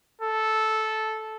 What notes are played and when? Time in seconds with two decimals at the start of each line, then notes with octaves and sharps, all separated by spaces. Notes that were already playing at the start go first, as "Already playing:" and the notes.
0.21 A4